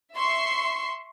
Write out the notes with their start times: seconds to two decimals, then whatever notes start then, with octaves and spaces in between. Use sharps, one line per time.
0.16 E5 C6 C#6 C7